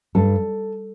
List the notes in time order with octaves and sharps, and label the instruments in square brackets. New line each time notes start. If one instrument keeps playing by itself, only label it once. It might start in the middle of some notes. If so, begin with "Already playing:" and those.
[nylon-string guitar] G2 A4